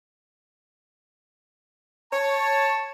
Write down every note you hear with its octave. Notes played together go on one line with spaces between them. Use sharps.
C#5 A5